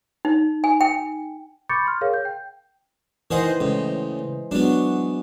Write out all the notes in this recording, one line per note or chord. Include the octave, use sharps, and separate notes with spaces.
D#4
G#5
G5
B5 C#6 D6 G6 A6 C#7
C6 F6
G#4 A#4 C#5 F5
G6
G5
D#3 E3 G#4 C5 D#5 F#5
C#2 A2 G#3
F#3 G#3 B3 D4 F#4